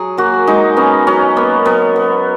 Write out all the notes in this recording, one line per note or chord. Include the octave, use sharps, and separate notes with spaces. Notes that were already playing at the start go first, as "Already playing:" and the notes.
Already playing: F#3 G#4
A#3 F#4
G#3 D#4
B3 C#4
F#3 C#4
A#3 B3
F#3 B3
B3